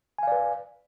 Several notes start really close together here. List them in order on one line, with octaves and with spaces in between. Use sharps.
G#5 F5 D5 B4